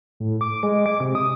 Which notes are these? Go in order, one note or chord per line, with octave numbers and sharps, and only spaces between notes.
A2
D6
G#3
D6
C3
D#6